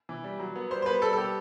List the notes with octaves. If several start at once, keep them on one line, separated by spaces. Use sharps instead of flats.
E3
G3
F#3
B3
G3 C5
C5
B3 B4
G3 A4
A4
B3 G4